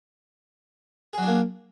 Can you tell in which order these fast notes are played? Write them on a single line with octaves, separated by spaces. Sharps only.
G#4 F#3 D4 A#3